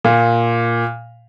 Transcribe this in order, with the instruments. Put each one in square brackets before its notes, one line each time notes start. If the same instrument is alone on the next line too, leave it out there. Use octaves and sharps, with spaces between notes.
[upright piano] A#2